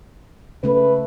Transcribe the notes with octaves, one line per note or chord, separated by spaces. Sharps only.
C#3 A3 B4